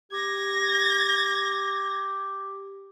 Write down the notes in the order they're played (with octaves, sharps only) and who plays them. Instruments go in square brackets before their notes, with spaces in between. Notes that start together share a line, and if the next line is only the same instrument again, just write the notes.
[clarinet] G4 [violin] G#6 A#6